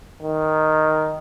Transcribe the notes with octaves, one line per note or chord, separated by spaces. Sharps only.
D#3